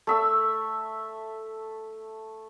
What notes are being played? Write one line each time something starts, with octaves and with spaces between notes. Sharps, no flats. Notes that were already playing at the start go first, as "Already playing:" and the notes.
A3 E5 E6